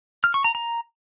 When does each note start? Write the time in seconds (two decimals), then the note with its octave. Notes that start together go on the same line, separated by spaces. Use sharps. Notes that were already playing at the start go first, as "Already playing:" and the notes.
0.24 F6
0.34 C#6
0.44 A#5
0.55 A#5